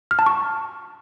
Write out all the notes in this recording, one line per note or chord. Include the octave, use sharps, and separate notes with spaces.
F6
A5
C#6